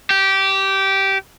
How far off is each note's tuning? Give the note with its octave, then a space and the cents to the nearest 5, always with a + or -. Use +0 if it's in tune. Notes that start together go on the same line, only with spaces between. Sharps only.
G4 -15